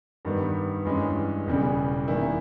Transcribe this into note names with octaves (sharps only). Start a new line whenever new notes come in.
G2 D#3 G3 B3
G2 E3 G#3 C#4
E1 E2 C#3 G3
E2 D#3 G3 A#3 E4